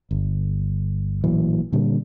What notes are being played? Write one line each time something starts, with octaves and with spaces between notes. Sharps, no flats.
G1
A1 A#2 E3 F#3
A#2 D3 G3